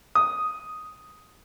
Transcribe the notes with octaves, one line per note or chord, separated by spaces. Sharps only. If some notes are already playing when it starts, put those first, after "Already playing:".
D#6